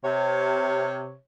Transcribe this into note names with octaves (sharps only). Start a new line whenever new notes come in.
C3 C#5